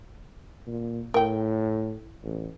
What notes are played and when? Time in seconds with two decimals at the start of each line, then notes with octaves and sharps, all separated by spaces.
0.67 A#2
1.14 A2 A#4 G5
2.23 A1